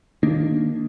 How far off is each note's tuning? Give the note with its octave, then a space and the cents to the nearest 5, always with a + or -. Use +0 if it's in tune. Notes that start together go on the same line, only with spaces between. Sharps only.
D#3 +0 A#3 +0 D4 +0